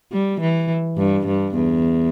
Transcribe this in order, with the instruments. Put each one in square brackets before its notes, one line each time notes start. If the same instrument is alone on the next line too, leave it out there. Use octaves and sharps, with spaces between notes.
[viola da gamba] G3
E3
G2
G2
E2